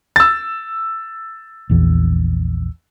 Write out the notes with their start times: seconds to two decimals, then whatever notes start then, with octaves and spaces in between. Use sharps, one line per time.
0.16 E6 A6
1.70 A#1 E2